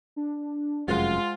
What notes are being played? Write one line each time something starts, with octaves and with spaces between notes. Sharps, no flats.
D4
F1 F#2 G#3 F4 G#4 C5 F#5